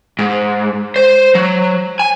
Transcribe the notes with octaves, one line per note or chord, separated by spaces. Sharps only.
G#2
C5
F#3
G#5